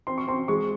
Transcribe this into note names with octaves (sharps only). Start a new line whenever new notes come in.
C4 C6
C#6
C4 C6
G#3 C#6